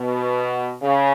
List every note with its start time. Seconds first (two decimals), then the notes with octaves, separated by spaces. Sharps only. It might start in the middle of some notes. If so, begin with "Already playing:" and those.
Already playing: B2
0.82 C#3